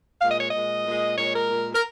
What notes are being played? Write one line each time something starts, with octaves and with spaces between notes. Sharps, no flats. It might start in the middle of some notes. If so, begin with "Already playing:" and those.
A#2 G#3 F5
D#5
C#5
D#5
A#2 G#3
A#2 G#3
A#2 G#3 C#5
A#4
A#2 G#3
A#4